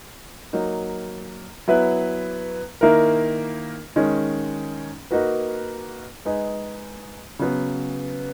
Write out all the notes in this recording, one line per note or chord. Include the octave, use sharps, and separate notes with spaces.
F#3 A#3 D#4
F#3 B3 E4 B4
D#3 A#3 E4 A#4
D#3 G#3 C#4
A#3 D#4 F#4 B4
G#3 D#4 G#4 B4
C#3 F#3 B3